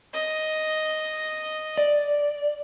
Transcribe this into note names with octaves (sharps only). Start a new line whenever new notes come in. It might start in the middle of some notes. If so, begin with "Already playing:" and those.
D#5
D5